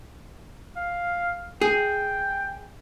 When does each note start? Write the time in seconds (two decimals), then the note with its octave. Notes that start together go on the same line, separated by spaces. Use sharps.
0.76 F5
1.61 G#4 G5